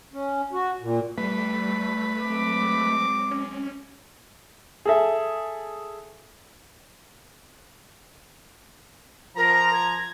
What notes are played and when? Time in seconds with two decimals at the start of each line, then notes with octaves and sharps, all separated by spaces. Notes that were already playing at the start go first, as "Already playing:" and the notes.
0.13 C#4
0.53 F#4
0.82 A#2
1.18 G3 A3 B4
2.20 F#3 G#3 C4 D6
3.31 C#4
4.86 G#4 A4 E5
9.37 F3 A#4 A#5
9.72 G#6